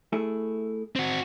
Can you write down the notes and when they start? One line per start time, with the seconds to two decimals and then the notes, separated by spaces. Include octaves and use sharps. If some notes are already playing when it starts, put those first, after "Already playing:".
0.13 A3 E4 G#4
0.96 C4 F#4